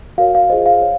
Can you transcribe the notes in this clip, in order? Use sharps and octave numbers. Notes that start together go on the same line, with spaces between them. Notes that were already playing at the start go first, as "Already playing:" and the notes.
F#4 A#4 C#5 F5
F5
F4 G#4 C5 D#5
F5
C#5